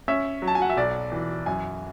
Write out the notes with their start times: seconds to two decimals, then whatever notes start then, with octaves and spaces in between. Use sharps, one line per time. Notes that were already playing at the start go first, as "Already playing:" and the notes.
0.08 C#4 E5
0.42 F#3
0.48 A5
0.55 G#5
0.62 F#5
0.70 E5
0.77 B1 D5
1.12 E3
1.46 F#2 G#5